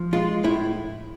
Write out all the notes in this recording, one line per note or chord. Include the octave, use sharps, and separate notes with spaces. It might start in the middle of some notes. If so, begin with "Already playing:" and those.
Already playing: F3
G#3 F4
A2 E4